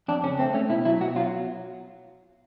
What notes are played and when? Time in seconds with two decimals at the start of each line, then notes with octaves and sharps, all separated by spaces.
0.08 F2 D4
0.24 C#3 C#4
0.39 A3 C4
0.54 A3 C#4
0.70 B2 E4
0.85 F#3 E4
1.01 B2 F#4
1.16 F#3 F4